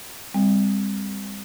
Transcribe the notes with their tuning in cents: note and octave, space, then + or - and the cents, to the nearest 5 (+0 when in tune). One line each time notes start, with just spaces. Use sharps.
G3 +35 C4 +0